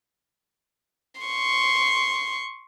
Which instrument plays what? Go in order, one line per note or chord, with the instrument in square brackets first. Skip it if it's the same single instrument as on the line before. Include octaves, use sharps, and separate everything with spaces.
[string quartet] C6 C#6